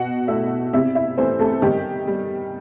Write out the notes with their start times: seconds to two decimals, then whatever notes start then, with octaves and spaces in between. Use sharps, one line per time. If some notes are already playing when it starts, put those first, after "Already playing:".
Already playing: B2 F#4 F#5
0.28 A3 E4 E5
0.73 C3 E4 E5
0.95 E4 E5
1.17 E3 A3 C4 C5
1.39 A3 A4
1.62 D#3 G3 G4
2.07 G3